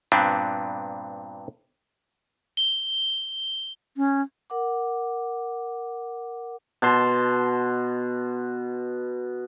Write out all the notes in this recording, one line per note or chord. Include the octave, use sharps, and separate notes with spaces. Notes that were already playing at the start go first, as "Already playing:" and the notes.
G2 A#2 B3 C4 D4
G7
C#4
A#4 F#5 D6
B2 A5 C6